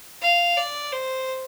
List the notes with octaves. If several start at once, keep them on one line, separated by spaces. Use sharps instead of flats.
F5
D5
C5